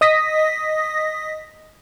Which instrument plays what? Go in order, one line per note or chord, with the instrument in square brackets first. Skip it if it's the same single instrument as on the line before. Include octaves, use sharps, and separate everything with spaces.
[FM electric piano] D#5 D#6 A#6 B6